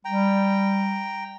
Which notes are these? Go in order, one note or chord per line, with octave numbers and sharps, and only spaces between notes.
G3 G5 A#5